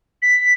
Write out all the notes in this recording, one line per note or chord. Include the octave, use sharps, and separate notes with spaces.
B6